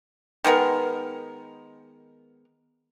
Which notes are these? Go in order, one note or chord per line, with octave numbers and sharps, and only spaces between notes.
D#3 G#3 B3 A#4